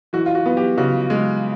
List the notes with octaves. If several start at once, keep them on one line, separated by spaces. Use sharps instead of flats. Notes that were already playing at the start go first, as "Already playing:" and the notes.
E3 F#4
F4
F#4
B3
G4
C#3 F#4
G#3